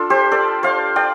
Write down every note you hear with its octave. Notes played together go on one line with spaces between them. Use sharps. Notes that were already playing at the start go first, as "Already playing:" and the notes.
Already playing: D4 F4 A4
G4 C5
A4 D5
C5 F5
D5 G5